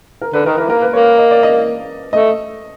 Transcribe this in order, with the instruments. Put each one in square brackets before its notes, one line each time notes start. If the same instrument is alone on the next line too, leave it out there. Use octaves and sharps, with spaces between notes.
[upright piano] A#4
[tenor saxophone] D3 [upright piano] B4
[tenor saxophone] D#3 [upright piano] A#4
[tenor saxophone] E3 [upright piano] A#4
[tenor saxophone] A#3 [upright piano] A#4
[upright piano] B4
[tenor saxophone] A#3 [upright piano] C#5
[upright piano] D#5
D5
D#5
[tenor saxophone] A3 [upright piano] D#5